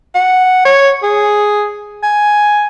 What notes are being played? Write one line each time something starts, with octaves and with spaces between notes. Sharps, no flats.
F#5
C#5
G#4
G#5